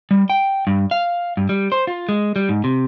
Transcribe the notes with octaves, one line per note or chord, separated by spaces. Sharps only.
G3
G5
G2
F5
G2
G3
C5
F4
G#3
G3
G#2
C3